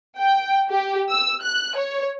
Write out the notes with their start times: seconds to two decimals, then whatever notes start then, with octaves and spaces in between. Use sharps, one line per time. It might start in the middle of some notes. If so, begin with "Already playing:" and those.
0.18 G5
0.69 G4
1.10 E6
1.42 F#6
1.77 C#5